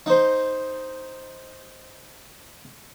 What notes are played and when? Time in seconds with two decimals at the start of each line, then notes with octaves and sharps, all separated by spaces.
0.06 D#4 C5